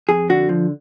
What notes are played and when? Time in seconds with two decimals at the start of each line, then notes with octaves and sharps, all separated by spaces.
0.09 F2 G#4
0.29 D3 F#4
0.49 F3